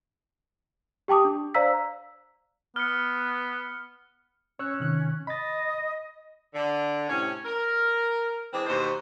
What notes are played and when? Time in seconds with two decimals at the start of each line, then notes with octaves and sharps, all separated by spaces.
1.08 G4 G5 A5 D6 D#6
1.25 D4
1.54 C5 D5 F5 A#5 E6 B6
2.76 B3 F6 C#7
4.59 C#4 C#5 E6 F#6
4.80 C3 D#3 F#6
5.27 D#5 B5 A6
6.54 D3
7.08 A2 C3 C#4
7.45 A#4
8.52 E3 G#3 C4 D4
8.66 D#2 B2 C5